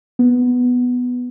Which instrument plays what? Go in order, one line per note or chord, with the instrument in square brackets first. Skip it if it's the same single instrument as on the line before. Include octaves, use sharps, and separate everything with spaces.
[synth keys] B3